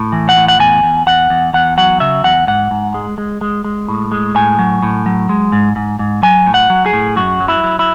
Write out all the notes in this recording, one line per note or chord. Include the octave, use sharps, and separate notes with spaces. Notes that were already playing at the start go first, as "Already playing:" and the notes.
Already playing: A2
E3
F#5
A2
F#5
E2 G#5
E2
E2 F#5
E2
E2 F#5
F#3 F#5
C#3 E5
E2 F#5
G#2 F#5
G#2
G#3
G#3
G#3
G#3
A2
G#3
A2 G#5
F#3
A2
F#3
G#3
G#2
G#2
G#2
F#3 G#5
A2
F#5
F#3
G#4
A2
F#2 F#4
F#3
E4
F#3
E4